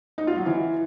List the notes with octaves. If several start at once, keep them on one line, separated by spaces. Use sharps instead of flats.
D#4
F4
F#3
E3